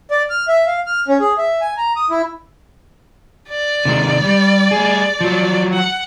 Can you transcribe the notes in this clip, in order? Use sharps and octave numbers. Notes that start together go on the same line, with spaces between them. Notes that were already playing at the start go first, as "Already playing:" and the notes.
D5
F6
E5
F5
F6
C#4
G#4
E5
G#5
A#5
D#6
E4
D5
C3 D#3 G#3
G3
G3 G#4
F3 F#3
F#5